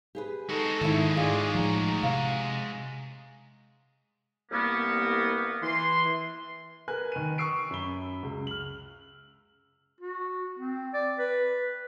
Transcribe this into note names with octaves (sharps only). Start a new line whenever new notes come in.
G4 G#4 B4
G#3 D#4 F#4 A4
G#2 D#3 E4
G#2 D#4 F4 G#4 D5
A2 F3 A#5
C3 F5
C2 A#3 B3
E3 C6
A#4 B4 G#5 F#6
D#3 D#7
C#6 D#6 E6 C7 D7
F#2 B5 G7
C#2
F6 F#7
F#4
C4
D5
B4